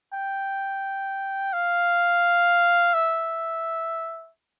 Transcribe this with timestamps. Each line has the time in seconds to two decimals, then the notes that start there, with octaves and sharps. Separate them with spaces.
0.13 G5
1.53 F5
2.94 E5